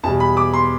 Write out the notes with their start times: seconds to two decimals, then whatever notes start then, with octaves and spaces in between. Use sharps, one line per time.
0.03 E2 B2 G3 A5
0.20 B5
0.37 D6
0.54 C6